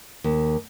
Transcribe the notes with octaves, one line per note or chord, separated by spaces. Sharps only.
D#2